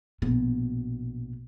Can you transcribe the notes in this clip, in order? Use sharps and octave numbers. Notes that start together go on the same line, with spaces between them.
A#1 B2